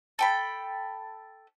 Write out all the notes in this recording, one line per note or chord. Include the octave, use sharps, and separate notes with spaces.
A4 G5 B5